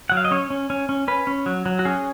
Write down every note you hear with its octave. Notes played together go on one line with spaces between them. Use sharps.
F#3 F#5
F5
D#5
C#4 C#5
C#4
C#4
C#4
C#4 B4
C#4
F#3
F#3
F#4
C#4 G#4